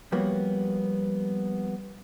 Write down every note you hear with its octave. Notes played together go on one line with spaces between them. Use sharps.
F3 G3 A#3 B3 F#4 C#5